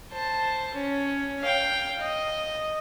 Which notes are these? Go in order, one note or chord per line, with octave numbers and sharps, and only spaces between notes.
C5 A5
C#4
F5 G5
D#5